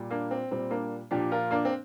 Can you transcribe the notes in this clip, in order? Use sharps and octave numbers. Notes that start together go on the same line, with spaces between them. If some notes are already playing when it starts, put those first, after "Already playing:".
Already playing: A#2 G3
A#3 D4
C4
A#2 G3 C4
A#3 D4
A#2 F3 D4 G4
F4 A#4
A#3 D4
C4